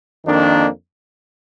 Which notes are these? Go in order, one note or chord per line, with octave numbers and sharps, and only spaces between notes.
F2 D#3 A#3 D4